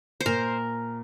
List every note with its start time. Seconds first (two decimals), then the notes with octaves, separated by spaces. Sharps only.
0.21 C5
0.26 A#2 A#4